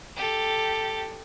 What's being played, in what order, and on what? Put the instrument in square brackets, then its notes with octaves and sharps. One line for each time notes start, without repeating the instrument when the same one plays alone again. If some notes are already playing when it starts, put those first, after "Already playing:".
[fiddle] G4 A4